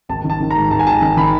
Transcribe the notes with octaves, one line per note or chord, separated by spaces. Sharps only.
G#1 A5
D#3
A5
D#3
A#5
G#2
G#1 A5
G#5
G#1 A5
D#3
D#3 B5